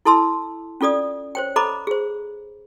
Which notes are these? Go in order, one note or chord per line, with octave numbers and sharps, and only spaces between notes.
E4 A4 A5 C6 E6
C#4 F4 A4 D5 D#6
C5 C#5 G5
A4 C5 D#5 A#5 B5 D6
G#4 C5